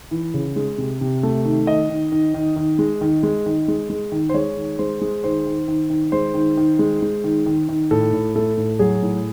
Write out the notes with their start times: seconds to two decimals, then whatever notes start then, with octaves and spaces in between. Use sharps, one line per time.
0.11 E3
0.34 C#3
0.56 G#3
0.78 C3
1.01 C3
1.23 A3
1.45 D#3
1.67 D#3 D#5
1.89 D#3
2.12 D#3
2.34 D#3
2.56 D#3
2.79 G#3
3.01 D#3
3.23 G#3
3.46 D#3
3.68 G#3
3.90 G#3
4.12 D#3
4.29 C5
4.34 G#3 C#5
4.57 D#3
4.79 G#3 C5
5.01 G#3
5.24 D#3 C5
5.46 D#3
5.68 D#3
5.90 D#3
6.12 G#3 C5
6.34 D#3
6.57 D#3
6.79 G#3
7.02 G#3
7.24 D#3
7.46 D#3
7.68 D#3
7.91 A2 A4
8.13 A2
8.35 A3 A4
8.57 A2
8.79 F#3 G#4
9.02 A2